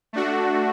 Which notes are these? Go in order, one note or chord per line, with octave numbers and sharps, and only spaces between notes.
A3 D4 F#4